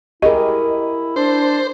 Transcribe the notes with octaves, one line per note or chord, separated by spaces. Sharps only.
E4 G4 G#4 A#4 D#5
D4 C5